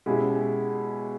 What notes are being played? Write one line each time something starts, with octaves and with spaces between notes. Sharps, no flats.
B2 G#3 C#4 E4 G4